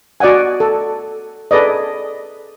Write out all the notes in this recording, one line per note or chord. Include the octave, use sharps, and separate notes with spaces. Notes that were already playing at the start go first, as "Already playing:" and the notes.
F#4 D5 D#5 F#5 G#5
A4
G#4 A4 B4 D5 D#5